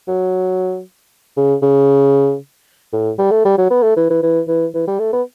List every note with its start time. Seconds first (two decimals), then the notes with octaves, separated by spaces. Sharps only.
0.08 F#3
1.37 C#3
1.62 C#3
2.93 A2
3.19 G3
3.31 A3
3.45 G3
3.58 F#3
3.70 B3
3.83 A3
3.97 E3
4.10 E3
4.23 E3
4.48 E3
4.74 E3
4.87 G3
4.99 A3
5.13 B3